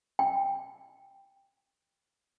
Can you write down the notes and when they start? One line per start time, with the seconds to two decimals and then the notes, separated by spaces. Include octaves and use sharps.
0.19 G5